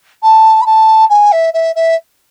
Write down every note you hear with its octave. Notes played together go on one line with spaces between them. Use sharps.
A5
B5
A5
G#5
E5
E5
E5